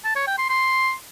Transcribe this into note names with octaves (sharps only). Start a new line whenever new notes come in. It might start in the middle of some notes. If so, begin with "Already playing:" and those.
A5
C#5
G5
C6
C6